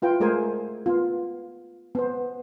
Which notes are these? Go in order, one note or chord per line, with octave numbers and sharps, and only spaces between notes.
E4 F4 B4 G5
G#3 A3 G#4 A#4 C5 G#5
B3 F4
B3 C5